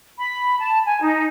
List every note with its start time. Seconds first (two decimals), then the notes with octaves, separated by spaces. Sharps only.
0.18 B5
0.60 A5
0.85 G#5
1.02 D#4